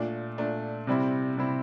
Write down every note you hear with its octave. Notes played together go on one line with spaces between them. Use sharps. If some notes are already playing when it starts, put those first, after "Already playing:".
Already playing: A#2 A3 D4
A#2 A3 D4
C3 G3 C4 E4
C3 G3 C4 E4